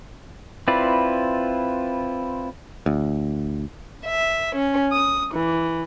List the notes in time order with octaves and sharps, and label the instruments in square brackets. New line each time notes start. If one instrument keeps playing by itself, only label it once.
[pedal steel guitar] C4 E4 F4 B4 D5
[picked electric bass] D2
[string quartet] E5
C#4
D#6
E3